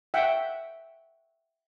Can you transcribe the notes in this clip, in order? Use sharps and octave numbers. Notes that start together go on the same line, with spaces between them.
E5 F#5 G5